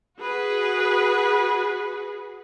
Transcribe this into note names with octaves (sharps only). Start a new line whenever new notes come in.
F#4 G#4 B4